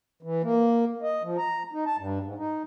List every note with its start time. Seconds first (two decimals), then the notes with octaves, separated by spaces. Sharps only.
0.23 E3
0.43 A#3
1.02 D#5
1.23 F3
1.38 A#5
1.73 D#4
1.86 A5
1.99 G2
2.23 G#2
2.38 D#4